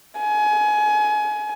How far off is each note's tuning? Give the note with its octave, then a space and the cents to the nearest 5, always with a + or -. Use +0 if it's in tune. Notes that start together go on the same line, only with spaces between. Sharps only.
G#5 +25